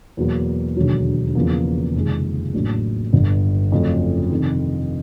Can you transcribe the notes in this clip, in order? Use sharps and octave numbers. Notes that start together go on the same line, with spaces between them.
E2 B2 F#3 A#3
E1 D#2 D3 F#3
E2 C#3 F3 A#3
F#1 F2 C3 D#3 G#3
A1 A2 F#3 A#3 D4
G1 G2 D3
F2 C#3 F#3 A3 C#4
F2 C3 D#3